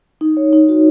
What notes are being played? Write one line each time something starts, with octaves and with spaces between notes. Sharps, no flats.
D#4
C#5
D#4
F#4